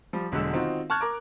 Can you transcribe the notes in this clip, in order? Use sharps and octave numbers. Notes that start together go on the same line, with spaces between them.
F3 G3
E1 D3 F#3 G#3 E6
D#3 C4 D#4 F4 F#4
A5 C#6 F6 F#6 G#6
A#4 A#5 D6